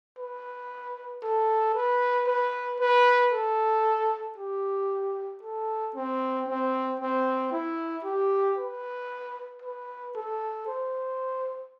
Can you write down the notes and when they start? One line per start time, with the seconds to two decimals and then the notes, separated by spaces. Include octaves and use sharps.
0.18 B4
1.23 A4
1.75 B4
2.27 B4
2.80 B4
3.33 A4
4.38 G4
5.42 A4
5.95 C4
6.47 C4
7.00 C4
7.52 E4
8.04 G4
8.58 B4
9.62 B4
10.15 A4
10.67 C5